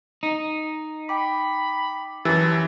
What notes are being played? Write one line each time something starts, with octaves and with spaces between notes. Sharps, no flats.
D#4
G5 B5 D6
F#2 E3 G4 A5 E6